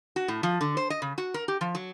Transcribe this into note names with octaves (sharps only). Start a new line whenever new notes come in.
F#4
A2
F3
D3
C5
D#5
C#3
F#4
A#4
G4
F3
F#3